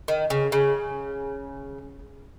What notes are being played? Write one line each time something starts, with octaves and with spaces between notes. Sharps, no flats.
D#3
C#3
C#3